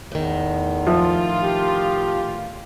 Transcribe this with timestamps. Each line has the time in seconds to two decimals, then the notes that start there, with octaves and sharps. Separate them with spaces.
0.12 E2 A2 D#3
0.87 F3 F4 E5
1.43 G4